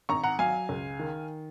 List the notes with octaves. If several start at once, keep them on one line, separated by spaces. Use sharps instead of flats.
G#1 A#5 C#6
F#5 A#5
F#3 F5 G#5
C#2
D#3